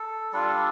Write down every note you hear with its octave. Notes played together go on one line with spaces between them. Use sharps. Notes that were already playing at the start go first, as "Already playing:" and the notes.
Already playing: A4
G3 D4 F4 A4
A4